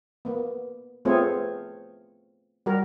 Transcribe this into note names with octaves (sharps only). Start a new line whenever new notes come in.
A#3 B3
A3 B3 C4 F4 G#4 C#5
G3 F#4 A#4